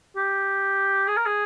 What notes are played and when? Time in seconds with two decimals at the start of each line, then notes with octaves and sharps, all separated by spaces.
0.16 G4
1.08 G#4
1.17 A#4
1.26 G#4